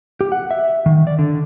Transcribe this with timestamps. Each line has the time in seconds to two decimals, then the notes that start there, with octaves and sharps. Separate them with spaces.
0.21 G4
0.32 F#5
0.51 E5
0.86 D#3
1.07 D5
1.19 D3